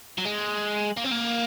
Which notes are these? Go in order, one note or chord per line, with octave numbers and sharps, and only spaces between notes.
F#3
G#3
A#3
C4
A#3